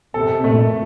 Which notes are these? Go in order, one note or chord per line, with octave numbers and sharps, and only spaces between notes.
C3 A4
A#2 A3